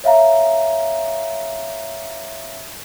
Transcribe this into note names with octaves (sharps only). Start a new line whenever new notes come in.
C#5 E5 F5 A#5